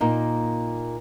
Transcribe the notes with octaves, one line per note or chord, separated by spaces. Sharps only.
A#2 A#3 D#4